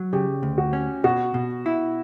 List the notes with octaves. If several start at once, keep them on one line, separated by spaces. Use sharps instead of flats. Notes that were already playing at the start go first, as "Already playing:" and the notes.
Already playing: F#3
C#3 G4
D2
F#4
C#4
B2 F#4
B2
E4